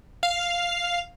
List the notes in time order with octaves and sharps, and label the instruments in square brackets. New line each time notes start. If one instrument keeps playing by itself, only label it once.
[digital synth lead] F5